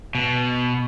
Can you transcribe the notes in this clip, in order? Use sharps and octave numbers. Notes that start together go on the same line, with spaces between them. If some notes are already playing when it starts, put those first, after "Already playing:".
B2